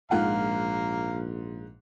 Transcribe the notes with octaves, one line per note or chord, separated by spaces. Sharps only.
A#1 G#2 F4 F5 F#5 A#5